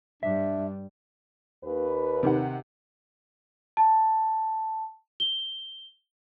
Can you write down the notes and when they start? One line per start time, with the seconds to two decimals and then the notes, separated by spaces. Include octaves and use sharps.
0.23 G2 G3 D4 E5
1.64 D#2 B4
2.23 C3 D#3 F#5
3.77 A5
5.20 G7